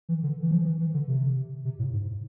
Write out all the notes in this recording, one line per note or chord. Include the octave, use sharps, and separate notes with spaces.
E3
D3
E3
F3
E3
E3
D3
C3
C3
A2
G#2